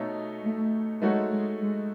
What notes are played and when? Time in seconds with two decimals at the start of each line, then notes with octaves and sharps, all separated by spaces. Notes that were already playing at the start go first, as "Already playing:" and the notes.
Already playing: B2 A3 D#4 A4 C#5
0.42 A3
1.02 G#3 A3 D#4 F#4 A4 C#5
1.32 G#3
1.62 G#3